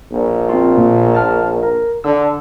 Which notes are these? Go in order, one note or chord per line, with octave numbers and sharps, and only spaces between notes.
A#1
C4 F4
A#2
A5 F6
A#4
D3 E6